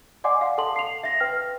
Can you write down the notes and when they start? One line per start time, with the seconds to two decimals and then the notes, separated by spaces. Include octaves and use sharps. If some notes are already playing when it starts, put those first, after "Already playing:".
0.24 D5 D#5 F#5 G#5 C6 D6
0.41 F5 F#5
0.58 A4 F#5 A5 C6 F#7
0.76 C7 F7
1.04 E5 A#6
1.20 B4 G5 F6